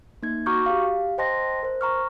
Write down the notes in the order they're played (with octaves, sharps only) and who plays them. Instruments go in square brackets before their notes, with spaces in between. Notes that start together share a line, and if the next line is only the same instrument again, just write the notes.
[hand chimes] A#3 D#4 G#6
F#4 A#5 C#6 D6 F6 G6
G4 F5
C5 D#5 G5 A5 C6 A#6
A#4 C5
A#5 C#6 F6